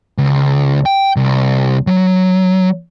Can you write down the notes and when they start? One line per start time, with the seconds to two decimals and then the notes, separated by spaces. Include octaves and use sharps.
0.18 C#2
0.86 G5
1.16 C2
1.87 F#3